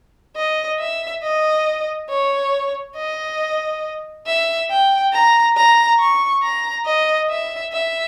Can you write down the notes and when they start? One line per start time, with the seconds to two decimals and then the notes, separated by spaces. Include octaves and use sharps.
0.36 D#5
0.79 E5
1.23 D#5
2.09 C#5
2.96 D#5
4.26 E5
4.70 G5
5.12 A#5
5.57 A#5
5.99 C#6
6.43 A#5
6.86 D#5
7.29 E5
7.73 E5